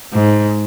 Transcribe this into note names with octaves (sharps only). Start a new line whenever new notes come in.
G#2